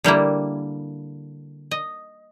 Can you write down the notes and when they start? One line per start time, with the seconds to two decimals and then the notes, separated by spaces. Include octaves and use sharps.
0.04 D3 G3 A#3 E4
1.71 D#5